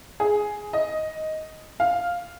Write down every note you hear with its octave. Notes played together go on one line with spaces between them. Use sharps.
G#4
D#5
F5